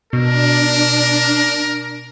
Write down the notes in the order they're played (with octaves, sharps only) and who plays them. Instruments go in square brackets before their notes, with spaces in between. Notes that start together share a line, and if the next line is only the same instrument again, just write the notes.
[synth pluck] B2 [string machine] D4 [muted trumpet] A#4